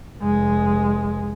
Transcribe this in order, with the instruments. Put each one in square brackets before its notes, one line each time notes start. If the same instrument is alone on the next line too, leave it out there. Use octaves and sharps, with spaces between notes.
[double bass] F1 G#3